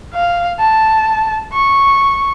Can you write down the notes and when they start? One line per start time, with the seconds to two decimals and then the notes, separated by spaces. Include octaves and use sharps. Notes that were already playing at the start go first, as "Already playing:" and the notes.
0.14 F5
0.60 A5
1.52 C#6